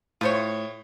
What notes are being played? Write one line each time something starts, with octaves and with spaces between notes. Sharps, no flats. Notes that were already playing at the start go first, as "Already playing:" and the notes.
A2 F4 C5 C#5 G6 C#7